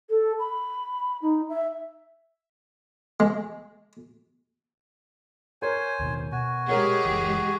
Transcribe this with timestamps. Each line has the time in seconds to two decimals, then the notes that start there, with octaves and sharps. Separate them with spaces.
0.10 A4
0.39 B5
1.22 D#4
1.49 E5
3.20 G#3
5.62 A#4 C5 C#5 G#5
6.00 D#2 B2 D#3
6.32 B2 F#4 G#5
6.68 G#3 G4 G#4 A#4 C#5 F#5
7.06 F#1 C2 E3